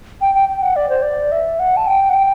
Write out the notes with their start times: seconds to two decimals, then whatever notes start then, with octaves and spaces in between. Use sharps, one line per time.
0.21 G5
0.35 G5
0.49 G5
0.62 F#5
0.76 D5
0.89 C5
1.02 D5
1.32 E5
1.59 F#5
1.77 A5
1.87 G5
2.10 F#5
2.14 G5